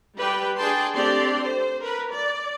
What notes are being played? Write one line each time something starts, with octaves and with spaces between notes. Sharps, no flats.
G3 G4 B4 G5
D4 G#4 G5 A5 C6
A3 C4 D4 G4 D5 C6
C5
A#4 B4
D5